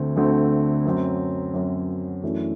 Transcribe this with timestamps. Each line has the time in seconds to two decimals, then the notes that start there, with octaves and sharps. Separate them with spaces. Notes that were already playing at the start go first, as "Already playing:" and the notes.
Already playing: D2 D3 A3 C4
0.16 D2 D3 A3 C4
0.85 F#2 F#3 C4
1.54 F#2 F#3 C4
2.23 F#2 E3 A3 D4